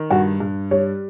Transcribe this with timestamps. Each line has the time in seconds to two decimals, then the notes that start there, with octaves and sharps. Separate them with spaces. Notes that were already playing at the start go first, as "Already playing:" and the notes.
Already playing: D#3
0.11 G2 F#4
0.40 G2
0.71 G3 C#5